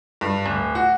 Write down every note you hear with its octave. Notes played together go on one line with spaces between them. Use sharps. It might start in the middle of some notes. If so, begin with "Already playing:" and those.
G2
D1
F#4